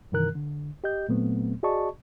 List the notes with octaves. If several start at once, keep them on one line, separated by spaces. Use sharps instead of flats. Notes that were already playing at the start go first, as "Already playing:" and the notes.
G2 C3 D#3 E3 A#4 F#6
D3
G4 D#5 G6
A#2 F#3 A3 B3 C4
F#4 G#4 D5 D#5 A5 C#6